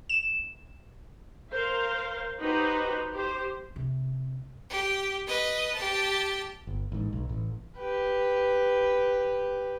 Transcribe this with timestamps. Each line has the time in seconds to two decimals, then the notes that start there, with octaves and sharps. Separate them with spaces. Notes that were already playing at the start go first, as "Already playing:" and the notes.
0.09 E7
1.51 A#4 C5 F5
2.39 D#4 F#4 G4 B4 C5
3.12 G4 C5
3.76 C3
4.70 G4
5.27 B4 D#5
5.75 G4 A5
6.67 G1
6.92 A1 G#2
7.13 B1
7.29 A1
7.77 G4 B4